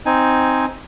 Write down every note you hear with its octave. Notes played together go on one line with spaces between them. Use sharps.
C4 D#4 G#5